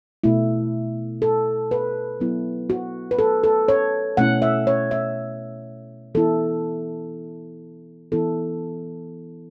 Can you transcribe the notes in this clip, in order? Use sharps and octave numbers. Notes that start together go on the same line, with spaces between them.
B2 A3 E4
A4
B4
F#3 B3 E4
F#4
B4
A4
A4
C#5
B2 A3 C#4 E4 F#5
E5
C#5
E5
E3 B3 E4 A4
E3 B3 E4 A4